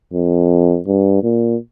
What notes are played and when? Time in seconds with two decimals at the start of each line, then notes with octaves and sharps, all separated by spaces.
0.14 F2
0.87 G2
1.23 A#2